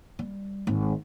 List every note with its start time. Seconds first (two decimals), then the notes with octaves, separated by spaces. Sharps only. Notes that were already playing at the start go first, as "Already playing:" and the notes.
0.19 G3
0.67 G#1